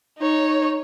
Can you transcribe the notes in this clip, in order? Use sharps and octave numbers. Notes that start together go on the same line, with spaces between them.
D#4 C#5